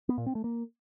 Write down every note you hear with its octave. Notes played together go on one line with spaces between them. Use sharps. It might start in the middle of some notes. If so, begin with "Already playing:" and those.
B3
A#2
C4
A3
A#3